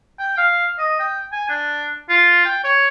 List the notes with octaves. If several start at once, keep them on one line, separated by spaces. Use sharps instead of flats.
G5
F5
D#5
G5
G#5
D4
F4
G5
C#5